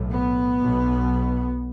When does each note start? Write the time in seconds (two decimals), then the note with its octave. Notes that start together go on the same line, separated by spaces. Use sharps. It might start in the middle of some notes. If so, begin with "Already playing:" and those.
Already playing: B1 A2
0.10 B3
0.61 B1 B2